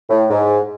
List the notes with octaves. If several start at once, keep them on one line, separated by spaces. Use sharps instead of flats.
A2
G#2